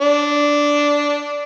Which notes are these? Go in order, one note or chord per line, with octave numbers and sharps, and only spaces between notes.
D4